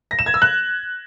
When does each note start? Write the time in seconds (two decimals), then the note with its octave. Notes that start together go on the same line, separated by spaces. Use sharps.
0.11 A#6
0.19 E7
0.26 G#6
0.34 E6
0.42 F#6